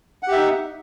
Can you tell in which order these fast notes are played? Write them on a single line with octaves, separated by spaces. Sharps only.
F#5 G4 E5 D#4